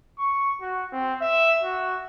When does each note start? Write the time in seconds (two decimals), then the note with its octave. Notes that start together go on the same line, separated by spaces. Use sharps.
0.19 C#6
0.62 F#4
0.92 C4
1.21 E5
1.63 F#4